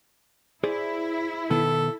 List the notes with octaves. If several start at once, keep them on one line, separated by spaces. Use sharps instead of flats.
E4 G#4 C5 D5
B2 D#3 B3 A4